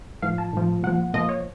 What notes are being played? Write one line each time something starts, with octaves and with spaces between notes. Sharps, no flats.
A2 F3 F5
A5
A2 F3
A#2 F3 F#5
A#2 F3 D#5
C#5